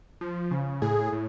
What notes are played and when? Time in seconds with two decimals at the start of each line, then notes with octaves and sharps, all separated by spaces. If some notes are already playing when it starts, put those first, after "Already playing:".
0.21 F3
0.51 C#3
0.82 A2 G#4
1.13 A2